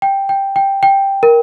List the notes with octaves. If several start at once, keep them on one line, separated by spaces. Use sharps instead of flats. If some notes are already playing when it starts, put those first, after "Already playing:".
G5
G5
G5
G5
A#4